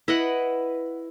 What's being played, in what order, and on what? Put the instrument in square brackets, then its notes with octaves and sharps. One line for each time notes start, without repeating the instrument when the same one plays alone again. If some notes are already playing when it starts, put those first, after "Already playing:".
[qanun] E4 D#5 F#5 [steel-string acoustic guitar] B4